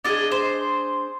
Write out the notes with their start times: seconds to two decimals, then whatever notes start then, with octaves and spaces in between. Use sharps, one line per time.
0.04 D4 F4 D#5
0.09 G#4
0.31 C5